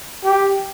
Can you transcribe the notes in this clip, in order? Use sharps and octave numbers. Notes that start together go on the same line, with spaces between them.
G4